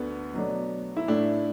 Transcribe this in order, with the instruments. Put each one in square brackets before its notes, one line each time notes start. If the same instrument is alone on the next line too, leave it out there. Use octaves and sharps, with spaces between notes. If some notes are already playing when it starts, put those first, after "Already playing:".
Already playing: [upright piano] D2 D3 A3 [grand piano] B3
[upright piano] B2 F#3 A3 D4
[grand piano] E4
[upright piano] A2 A3 E4 [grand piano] D4